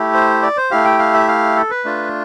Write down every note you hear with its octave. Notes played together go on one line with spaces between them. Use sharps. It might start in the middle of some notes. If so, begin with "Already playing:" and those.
Already playing: A3 E4 G4
C5
D5
C5
A3 E4 G4 F5
G5
F5
E5
F5
A4
B4
A3 D4 F4